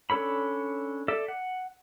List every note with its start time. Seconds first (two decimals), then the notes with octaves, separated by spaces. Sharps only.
0.10 C#4 D4 A4 C#5 B5
1.08 A4 D5 E5
1.28 F#5